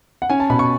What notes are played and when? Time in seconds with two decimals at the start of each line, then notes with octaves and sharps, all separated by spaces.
0.22 F#5
0.30 C#4 G#5
0.40 A5
0.50 B2 B5
0.59 C#6